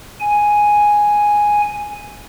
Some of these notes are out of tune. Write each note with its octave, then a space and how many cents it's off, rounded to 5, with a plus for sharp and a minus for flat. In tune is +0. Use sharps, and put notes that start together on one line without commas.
G#5 +0